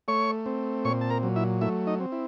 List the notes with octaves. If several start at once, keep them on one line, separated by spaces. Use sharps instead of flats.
A3 C#5 C#6
C4
A#2 C#5 C#6
A5
A#4 A#5
F#3
E4 E5
A3 E4 E5
D#4 D#5
C4
E4